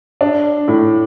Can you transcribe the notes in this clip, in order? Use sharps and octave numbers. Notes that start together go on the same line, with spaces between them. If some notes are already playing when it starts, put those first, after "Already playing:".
D4
A2